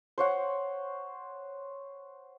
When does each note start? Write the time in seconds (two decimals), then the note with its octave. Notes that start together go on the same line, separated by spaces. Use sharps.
0.18 C5 C#5 F#5